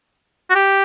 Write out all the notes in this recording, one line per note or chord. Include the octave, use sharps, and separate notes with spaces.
F#4
G4